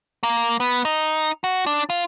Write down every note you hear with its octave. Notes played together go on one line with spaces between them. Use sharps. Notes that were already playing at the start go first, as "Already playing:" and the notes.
A#3
B3
D#4
F#4
D4
F4